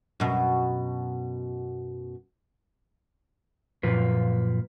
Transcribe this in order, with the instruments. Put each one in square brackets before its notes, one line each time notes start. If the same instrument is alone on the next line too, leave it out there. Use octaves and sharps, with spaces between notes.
[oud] F#2 B2
[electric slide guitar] F#2 A#2 F3 F4 B4